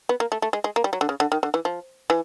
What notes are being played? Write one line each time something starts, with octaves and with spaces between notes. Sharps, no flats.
B3
A#3
A3
A3
G#3
G#3
A#3
G3
F#3
D3
C#3
D3
D#3
D3
E3
F3
E3